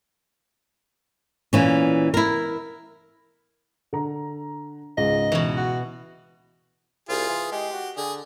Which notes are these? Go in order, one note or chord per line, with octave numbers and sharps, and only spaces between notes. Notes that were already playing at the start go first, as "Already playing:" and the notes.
A#2 E3 C#4
E4 A#4
D3 A#5
C#2 G#2 D#5
B2 E3
F#4
C2 F4 G#4
E3
G#3 G4
F#4
D3 G#4